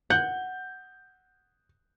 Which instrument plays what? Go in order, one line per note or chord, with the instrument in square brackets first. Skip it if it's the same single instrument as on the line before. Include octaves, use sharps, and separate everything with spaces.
[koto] F#5 [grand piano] G6